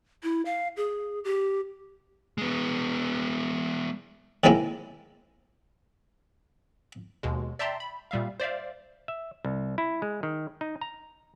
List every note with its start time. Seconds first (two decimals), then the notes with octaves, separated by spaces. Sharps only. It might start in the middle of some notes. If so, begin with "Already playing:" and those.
0.23 E4
0.45 F5
0.77 G#4
1.24 G4
2.38 G#3 B3
4.44 A2 C3 D#3 G#3 A#3 E4
7.23 D#2 B2 G#3
7.59 D5 E5 G5 A5 A#5 C6
7.80 B5
8.11 A#2 G3 E5 F5
8.40 C5 D5 E5 F5
9.08 E5
9.45 C2
9.78 E4
10.02 G#3
10.23 D#3
10.61 D#4
10.81 A#5